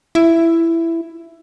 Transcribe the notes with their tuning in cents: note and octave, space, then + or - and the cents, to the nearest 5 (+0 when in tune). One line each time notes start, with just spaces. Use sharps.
E4 +10